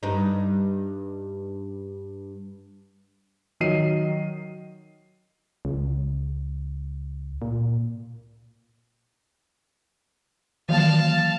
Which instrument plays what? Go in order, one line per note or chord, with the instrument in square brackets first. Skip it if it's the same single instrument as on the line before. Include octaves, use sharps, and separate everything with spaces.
[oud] G2 D#4
[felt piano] D#3 F#3 D#5 C7 D#7
[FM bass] C#2
A#2
[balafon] D#3 F#3 A#3 [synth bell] E3 [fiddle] F5 A5